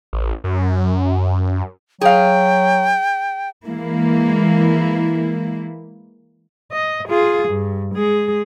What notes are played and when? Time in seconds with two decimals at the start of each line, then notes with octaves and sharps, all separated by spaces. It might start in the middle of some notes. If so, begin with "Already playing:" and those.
0.13 A1
0.44 F#2
2.01 F#3 G#4 F5 G5
3.65 E3 G#3 A#3 E4
6.72 D#5
7.09 F4 G#4
7.49 G2
7.95 G#3 G#4